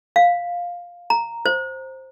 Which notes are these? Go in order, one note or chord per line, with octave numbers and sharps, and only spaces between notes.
F5
A#5
C5